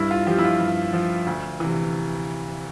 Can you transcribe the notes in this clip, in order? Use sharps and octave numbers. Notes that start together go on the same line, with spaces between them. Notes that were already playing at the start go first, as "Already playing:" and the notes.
Already playing: G2 E4
F4
F3 G4
E4
F4
G2
F3
D2
C3 E3